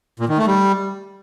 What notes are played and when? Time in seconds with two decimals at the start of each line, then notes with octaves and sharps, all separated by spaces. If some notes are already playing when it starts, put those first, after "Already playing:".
0.20 A#2
0.29 D#3
0.38 A3
0.47 G3